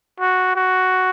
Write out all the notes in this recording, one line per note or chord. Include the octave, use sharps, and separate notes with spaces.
F#4
F#4